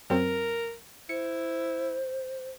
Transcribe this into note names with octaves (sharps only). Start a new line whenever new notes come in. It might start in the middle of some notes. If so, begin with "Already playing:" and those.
F#2 F#3 C4 A#4
E4 C5 C#7